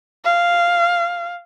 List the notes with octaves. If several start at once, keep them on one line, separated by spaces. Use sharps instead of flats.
F5